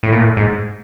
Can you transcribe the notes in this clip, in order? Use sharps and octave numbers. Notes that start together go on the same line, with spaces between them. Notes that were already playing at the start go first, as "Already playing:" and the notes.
A2
A#2
A2
G#2